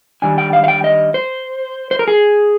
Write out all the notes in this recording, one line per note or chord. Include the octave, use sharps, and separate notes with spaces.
D#3 G3 D4 G#5
G5
F5
F5
G5
D#5
C5
C5
A#4
G#4